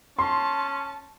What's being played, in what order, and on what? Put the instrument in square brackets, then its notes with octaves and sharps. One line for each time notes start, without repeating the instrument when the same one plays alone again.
[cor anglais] C#4 [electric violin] A5 [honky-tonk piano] C6